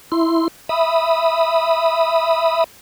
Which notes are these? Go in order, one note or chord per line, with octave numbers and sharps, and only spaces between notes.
E4 C6
E5 B5 D#6